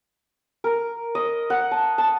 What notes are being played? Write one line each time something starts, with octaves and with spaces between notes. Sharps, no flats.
A#4
D#5
F#5
A5
A5